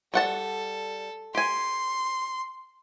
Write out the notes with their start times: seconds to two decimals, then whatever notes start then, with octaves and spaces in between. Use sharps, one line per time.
0.14 G3 A4 F#5 A5
1.35 G4 G#5 C6